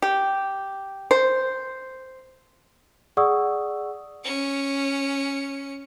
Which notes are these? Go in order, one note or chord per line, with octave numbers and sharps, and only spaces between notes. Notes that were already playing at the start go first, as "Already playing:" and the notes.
G4
C5
G#4 D5 F#5 C#6 D#6 E6
C#4 C#7